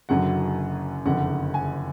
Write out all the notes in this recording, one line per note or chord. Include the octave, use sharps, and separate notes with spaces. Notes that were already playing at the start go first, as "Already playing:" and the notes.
F#1 F#2 D3 F#3 F#5
F#1 F2 D3 F#5
G#5